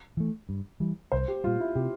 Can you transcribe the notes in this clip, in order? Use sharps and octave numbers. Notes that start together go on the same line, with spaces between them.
E3 A3
G2
E3 G3
C2 C5
G4
A#2 G3 F4
E4
C3 G4